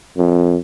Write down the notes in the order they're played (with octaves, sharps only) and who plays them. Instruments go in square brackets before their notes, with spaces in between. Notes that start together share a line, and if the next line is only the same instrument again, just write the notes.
[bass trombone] F2